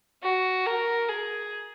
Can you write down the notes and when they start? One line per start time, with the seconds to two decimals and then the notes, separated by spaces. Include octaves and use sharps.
0.22 F#4
0.66 A#4
1.08 G#4